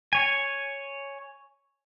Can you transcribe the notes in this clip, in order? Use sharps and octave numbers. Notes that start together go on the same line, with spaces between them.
C#5 G#5